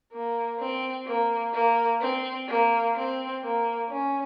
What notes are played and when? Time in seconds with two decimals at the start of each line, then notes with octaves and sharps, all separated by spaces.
0.12 A#3
0.59 C4
1.07 A#3
1.53 A#3
2.01 C4
2.48 A#3
2.96 C4
3.43 A#3
3.89 C#4